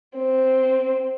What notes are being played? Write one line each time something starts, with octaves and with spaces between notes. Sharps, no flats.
C4